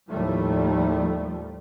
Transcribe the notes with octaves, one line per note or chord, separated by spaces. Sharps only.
D#2 A2 F3 G3 A3